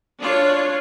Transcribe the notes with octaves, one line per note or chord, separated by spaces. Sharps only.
D4 F4 C#5